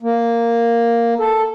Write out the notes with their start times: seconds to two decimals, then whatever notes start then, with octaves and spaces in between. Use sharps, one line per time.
0.03 A#3
1.20 A4